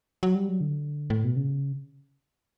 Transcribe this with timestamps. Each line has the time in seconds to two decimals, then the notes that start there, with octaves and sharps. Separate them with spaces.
0.23 F#3
0.35 G3
0.49 F#3
0.61 D3
1.10 A2
1.24 B2
1.36 C#3